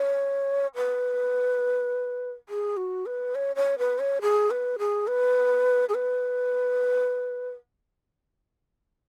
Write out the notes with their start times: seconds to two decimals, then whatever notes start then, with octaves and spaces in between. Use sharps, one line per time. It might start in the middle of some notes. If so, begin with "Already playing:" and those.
Already playing: C#5
0.76 B4
2.49 G#4
2.77 F#4
3.06 B4
3.35 C#5
3.56 C#5
3.79 B4
3.99 C#5
4.22 G#4
4.51 B4
4.79 G#4
5.07 B4
5.89 G#4
5.94 B4